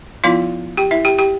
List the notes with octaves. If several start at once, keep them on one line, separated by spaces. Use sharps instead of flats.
F3 B3 E4 F4 F5
G4 G5
E4 E5
G4 G5
G4 G5